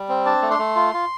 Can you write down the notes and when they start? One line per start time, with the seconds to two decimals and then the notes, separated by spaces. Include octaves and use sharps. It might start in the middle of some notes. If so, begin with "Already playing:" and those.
Already playing: G3
0.09 C4
0.26 D4 A5
0.42 A3
0.51 C6
0.59 A3
0.76 F4
0.94 F4